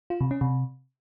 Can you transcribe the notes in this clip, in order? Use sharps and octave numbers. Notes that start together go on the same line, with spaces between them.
F4
C3
C#4
C3